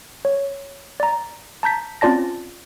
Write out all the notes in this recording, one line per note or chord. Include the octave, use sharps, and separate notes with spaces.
C#5
D5 A#5
A5 A#5 G6 B6
C4 C#4 F4 D5 A5 A#6